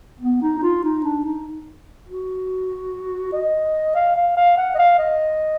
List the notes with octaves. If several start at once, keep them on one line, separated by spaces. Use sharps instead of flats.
B3
D#4
D#4
F4
D#4
D4
D#4
F#4
D#5
F5
F5
F5
F#5
D#5
F5
D#5